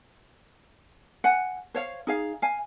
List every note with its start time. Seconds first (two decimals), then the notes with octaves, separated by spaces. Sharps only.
1.24 F#5 G#5
1.74 C5 C#5 F5
2.07 D#4 G#4 F5
2.42 F5 G#5